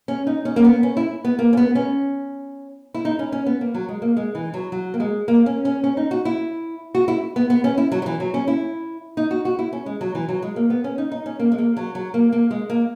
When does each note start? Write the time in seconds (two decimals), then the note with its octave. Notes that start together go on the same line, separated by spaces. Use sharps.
0.08 C#4
0.27 D#4
0.45 C#4
0.56 A#3
0.64 B3
0.83 C#4
0.97 E4
1.24 B3
1.39 A#3
1.53 C#4
1.57 B3
1.75 C#4
2.94 E4
3.05 D#4
3.19 C#4
3.32 C#4
3.46 B3
3.61 A#3
3.74 F#3
3.89 G#3
4.02 A#3
4.17 G#3
4.35 E3
4.54 F#3
4.72 F#3
4.94 A#3
5.00 G#3
5.28 A#3
5.46 C#4
5.65 C#4
5.84 C#4
5.97 D#4
6.11 F#4
6.25 E4
6.95 F#4
7.08 E4
7.36 B3
7.50 B3
7.64 C#4
7.78 E4
7.92 F#3
8.02 F#3
8.06 E3
8.20 F#3
8.34 C#4
8.48 E4
9.17 D#4
9.31 F#4
9.45 F#4
9.59 E4
9.73 C#4
9.86 G#3
10.01 F#3
10.15 E3
10.29 F#3
10.42 G#3
10.56 A#3
10.70 B3
10.84 C#4
10.98 D#4
11.12 D#4
11.26 C#4
11.39 A#3
11.52 G#3
11.58 A#3
11.77 F#3
11.95 F#3
12.14 A#3
12.32 A#3
12.51 G#3
12.70 A#3